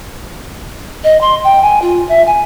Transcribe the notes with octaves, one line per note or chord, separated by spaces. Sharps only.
D#5
C6
G5
G#5
F4
E5
G#5